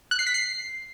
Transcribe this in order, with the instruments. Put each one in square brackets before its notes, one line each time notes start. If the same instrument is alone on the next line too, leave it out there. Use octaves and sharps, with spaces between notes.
[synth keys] F#6
C7
B6
C7